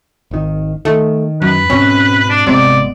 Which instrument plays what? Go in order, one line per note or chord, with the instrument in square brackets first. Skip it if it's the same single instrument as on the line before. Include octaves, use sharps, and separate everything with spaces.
[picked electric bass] G#1 D#3
[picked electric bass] D#3 [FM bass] A3
[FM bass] F#2 [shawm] B4
[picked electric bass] G#2 B2 C4 [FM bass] C#4
[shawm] D4
[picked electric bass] G#1 G#3 B3 [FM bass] C3 [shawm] D5